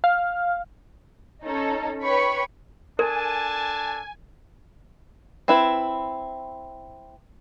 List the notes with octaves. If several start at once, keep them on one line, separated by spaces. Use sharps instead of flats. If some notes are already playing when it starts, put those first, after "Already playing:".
F5
C#4 D#4 A4
B4 C#5 G5 B5 C#6
D4 A4 A#4 G#5 A5
C4 E4 B4